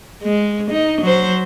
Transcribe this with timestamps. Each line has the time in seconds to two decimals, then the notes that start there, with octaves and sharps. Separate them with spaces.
0.23 G#3
0.71 D#4
1.02 F#3 C5